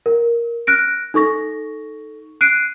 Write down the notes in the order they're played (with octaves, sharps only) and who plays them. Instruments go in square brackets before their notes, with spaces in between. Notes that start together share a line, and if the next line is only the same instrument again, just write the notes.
[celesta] A#4
F6 F#6 A#6 D7
D#4 A4 C#6 A#6
F#6 C7 D7 D#7